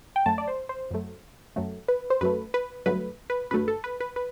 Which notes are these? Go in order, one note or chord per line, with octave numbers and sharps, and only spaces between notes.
G5
F#2 F#3 A3 A5
D5
C5
C5
F#2 F#3 A3
F#2 F#3 A3
B4
C5
F#2 F#3 A3 B4
B4
G1 G2 F#3 A3 B4
B4
G1 G2 F#3 A3 B4
A4
B4
B4
B4